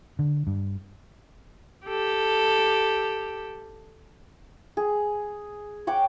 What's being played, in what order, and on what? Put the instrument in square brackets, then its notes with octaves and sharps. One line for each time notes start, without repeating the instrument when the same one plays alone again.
[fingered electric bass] D3
G2
[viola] G4 A4
[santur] G#4
C#5 F#5 G5 D6